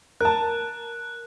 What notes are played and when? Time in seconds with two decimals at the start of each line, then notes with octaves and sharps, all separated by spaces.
0.21 A#4 A5 F#6